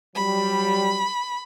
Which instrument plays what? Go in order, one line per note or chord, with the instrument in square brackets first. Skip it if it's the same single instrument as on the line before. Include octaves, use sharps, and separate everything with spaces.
[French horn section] F#3 G3 [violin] B5